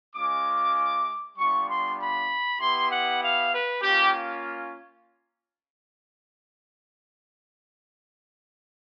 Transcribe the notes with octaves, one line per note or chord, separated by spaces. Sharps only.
G#3 C#4 F4 D6
G3 B3 D4 F4 C#6
C6
B5
B3 E4 G4 C6
F#5
F5
B4
A#3 C#4 F4 G4